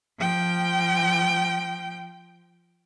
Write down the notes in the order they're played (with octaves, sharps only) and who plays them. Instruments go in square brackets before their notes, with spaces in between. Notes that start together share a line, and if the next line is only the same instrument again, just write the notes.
[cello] F3 G5